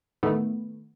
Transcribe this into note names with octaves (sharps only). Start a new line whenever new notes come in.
A2 D#3 A3 B3